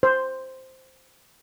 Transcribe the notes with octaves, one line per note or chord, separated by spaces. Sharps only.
C5